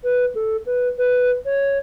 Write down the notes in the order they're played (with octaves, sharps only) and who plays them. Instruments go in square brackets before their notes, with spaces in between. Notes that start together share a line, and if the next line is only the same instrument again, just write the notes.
[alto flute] B4
A4
B4
B4
C#5